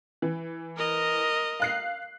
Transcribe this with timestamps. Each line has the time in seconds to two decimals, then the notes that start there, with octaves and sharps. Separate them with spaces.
0.22 E3
0.77 A#4 D#5
1.60 F5 F#6 C7